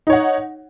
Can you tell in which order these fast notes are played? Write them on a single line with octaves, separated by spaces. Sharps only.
D#4 C#5 F#5